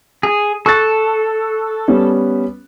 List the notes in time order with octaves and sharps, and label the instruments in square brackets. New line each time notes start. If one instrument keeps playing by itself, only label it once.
[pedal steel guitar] G#4
[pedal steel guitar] A4 [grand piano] C#6 F#6 A6
[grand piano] G3 B3 C#4